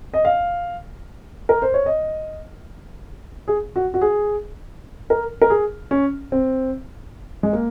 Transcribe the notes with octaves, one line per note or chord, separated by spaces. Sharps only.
D#5
F5
A#4
C5
C#5
D#5
G#4
F#4
F#4
G#4
A#4
A#4
G#4
C#4
C4
G#3
A#3